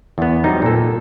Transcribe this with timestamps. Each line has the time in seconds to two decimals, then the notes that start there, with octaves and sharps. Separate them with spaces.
0.18 E2 B3
0.44 F#3 G3 C4 D#4
0.62 A#2 A4